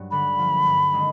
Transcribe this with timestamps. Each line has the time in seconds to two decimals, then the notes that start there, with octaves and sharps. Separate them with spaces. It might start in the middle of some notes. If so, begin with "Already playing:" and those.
Already playing: G2 F#3
0.11 D3 B5
0.39 F3 A#3
0.66 G2
0.93 D#3 G#3 C4